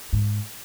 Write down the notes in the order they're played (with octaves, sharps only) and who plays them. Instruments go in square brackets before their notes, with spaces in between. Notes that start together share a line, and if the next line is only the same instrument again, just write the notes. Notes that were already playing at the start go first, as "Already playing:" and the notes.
[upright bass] G#2